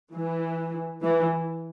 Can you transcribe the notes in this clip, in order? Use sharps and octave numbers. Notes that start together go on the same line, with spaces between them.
E3
E3